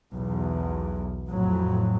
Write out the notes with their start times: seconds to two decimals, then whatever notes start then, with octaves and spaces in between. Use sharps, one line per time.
0.11 B1 E2
1.27 F2 A2 F#3